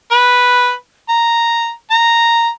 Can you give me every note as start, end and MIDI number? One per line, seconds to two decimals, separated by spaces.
0.12 0.71 71
1.09 1.70 82
1.91 2.48 82